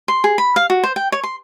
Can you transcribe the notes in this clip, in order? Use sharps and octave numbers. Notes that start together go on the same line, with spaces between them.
C6
G#4
B5
F5
F#4
C5
G5
C#5
C6